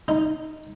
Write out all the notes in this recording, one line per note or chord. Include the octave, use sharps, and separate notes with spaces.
D#4